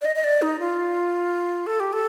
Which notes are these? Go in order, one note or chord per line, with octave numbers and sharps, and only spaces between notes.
D5
D#5
D#5
D5
D#4
F4
A4
G4
A4